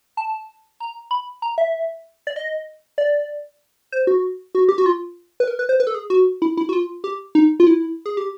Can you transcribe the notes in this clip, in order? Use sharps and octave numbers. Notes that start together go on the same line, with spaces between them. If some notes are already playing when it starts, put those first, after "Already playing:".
A5
A#5
B5
A#5
E5
D5
D#5
D5
C5
F#4
F#4
G4
F#4
F4
B4
A#4
B4
C5
B4
A4
G#4
F#4
E4
E4
F#4
F4
G4
D#4
F4
E4
G#4
G4